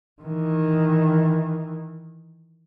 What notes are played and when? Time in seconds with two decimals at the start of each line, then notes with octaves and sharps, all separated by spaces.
0.22 D#3 E3